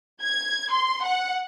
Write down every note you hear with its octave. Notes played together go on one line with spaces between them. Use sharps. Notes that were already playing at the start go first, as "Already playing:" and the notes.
G#6
C6
F#5